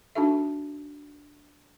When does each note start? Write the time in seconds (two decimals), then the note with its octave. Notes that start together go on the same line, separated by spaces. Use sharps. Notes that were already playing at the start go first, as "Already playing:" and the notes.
0.15 D4 D#4 F#4 A4 E5